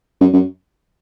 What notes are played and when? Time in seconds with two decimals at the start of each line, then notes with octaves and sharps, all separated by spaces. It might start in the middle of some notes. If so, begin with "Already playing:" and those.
0.21 F#2
0.34 F#2